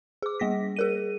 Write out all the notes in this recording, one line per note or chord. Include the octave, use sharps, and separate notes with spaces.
G#4 D6
G3 A#3 A#6 B6
G#4 A#4 D#7